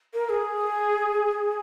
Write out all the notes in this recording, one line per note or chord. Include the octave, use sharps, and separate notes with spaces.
A#4
A#4
G#4